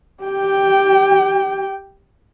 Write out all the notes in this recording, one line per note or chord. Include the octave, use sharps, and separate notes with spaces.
G4 G5